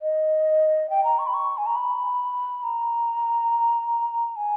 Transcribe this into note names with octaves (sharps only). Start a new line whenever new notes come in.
D#5
G5
A#5
C#6
B5
C#6
G#5
A#5
B5
A#5
G#5